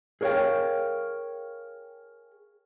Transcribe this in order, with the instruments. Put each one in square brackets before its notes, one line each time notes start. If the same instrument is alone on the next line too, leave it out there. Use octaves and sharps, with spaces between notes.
[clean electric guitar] G#4 A#4 C#5 D#5 F5 G5